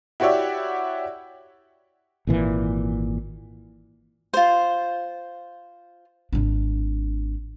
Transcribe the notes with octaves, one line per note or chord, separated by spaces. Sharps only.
E4 F#4 G4 C#5 D5 E5
G#1 A#2 E3
F4 C5
G#1 D4